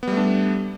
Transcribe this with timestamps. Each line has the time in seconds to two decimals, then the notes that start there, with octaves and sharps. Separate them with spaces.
0.03 B3
0.07 G3
0.12 A3
0.17 D4